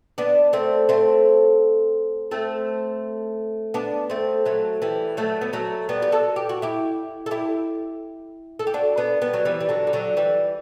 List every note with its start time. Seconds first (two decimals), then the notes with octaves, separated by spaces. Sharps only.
0.18 B3 D4
0.53 A3 C4
0.89 A3 C4
2.31 A3 C4
3.74 B3 D4
4.10 A3 C4
4.46 F#3 A3
4.82 E3 G3
5.17 F#3 A3
5.41 B3
5.53 F#3 A3
5.89 G3 B3
6.02 G4
6.12 F#4 A4
6.36 G4
6.49 F#4
6.62 E4 G4
7.26 A4
7.31 E4 G4
8.59 A4
8.67 G4
8.74 D4 F#4
8.97 B3 D4
9.22 G3 B3
9.33 F#3
9.45 E3 G3
9.60 G3
9.69 D3 F#3
9.87 G3
9.93 D3 F#3
10.17 E3 G3